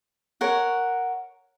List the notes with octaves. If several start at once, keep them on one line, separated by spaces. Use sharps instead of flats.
A#4 C#5 F#5